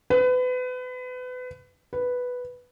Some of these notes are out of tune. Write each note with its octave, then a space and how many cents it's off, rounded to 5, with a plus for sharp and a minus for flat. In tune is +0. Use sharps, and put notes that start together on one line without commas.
B4 +30
B4 +0